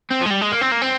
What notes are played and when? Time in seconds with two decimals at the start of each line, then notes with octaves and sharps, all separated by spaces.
0.11 C4
0.21 F3
0.26 G#3
0.31 G3
0.42 G#3
0.52 A#3
0.61 C4
0.72 A#3
0.82 C4